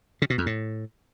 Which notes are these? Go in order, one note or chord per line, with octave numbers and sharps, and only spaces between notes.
C#3
B2
F2
A2